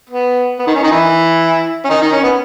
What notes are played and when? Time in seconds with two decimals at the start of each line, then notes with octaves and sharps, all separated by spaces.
0.09 B3
0.59 B3
0.67 D#3 D#4
0.75 C#4
0.83 D#3 D#4
0.91 E3 E4
1.85 C#4
1.90 D#3 D#4
2.01 D#3 D#4
2.12 C#4
2.24 B3